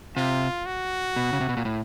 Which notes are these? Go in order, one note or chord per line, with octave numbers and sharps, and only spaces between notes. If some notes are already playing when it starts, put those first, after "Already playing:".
C3 F4
F#4
B2
C#3
C3
B2
A#2
A2